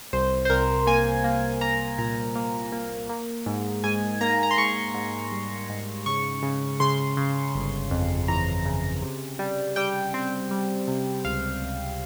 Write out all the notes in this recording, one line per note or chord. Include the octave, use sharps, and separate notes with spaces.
C2 C5
C5
C2 A#4
A#3 G#5
A#3
A#3 A#5
A#2 A#5
A#3
A#3
A#3
G#2
G#2 G#5
A#3 A#5
A#5
C6
G#2 C#6
G#2
G3
G#2
C#3 C#6
C#3
C#3 C6
C#3
G1
F2
E3 A#5
C#3
C3
G3
G3 G5
C4
G3
C3
C#2 F5
C#2